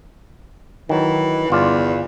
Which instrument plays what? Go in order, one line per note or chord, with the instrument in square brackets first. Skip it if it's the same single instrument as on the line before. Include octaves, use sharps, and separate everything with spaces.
[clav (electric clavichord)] D#3 F#3 [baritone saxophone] E3
[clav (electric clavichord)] G1 F4 D5 [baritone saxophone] E2